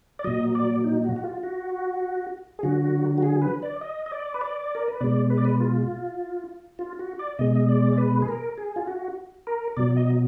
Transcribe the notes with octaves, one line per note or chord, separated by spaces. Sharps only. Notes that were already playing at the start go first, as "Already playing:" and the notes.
D5
A#2 F#3 D#5
D5
D#4
F#4
F#4
F4
F#4
G#4
D3 F#3 F#4
F#4
G#4
B4
D5
D#5
D#5
D5
B4
D5
A#4
B4
B2 G#3 D5
B4
D5
B4
F4
F4
F#4
D5
B2 G#3 D#5
D#5
D5
D5
B4
G#4
A#4
G#4
F4
F#4
A#4
B2 F#3 D5
D#5